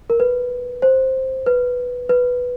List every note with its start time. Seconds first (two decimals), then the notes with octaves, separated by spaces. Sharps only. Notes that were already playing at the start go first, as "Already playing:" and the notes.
0.10 A#4
0.20 B4
0.82 C5
1.46 B4
2.09 B4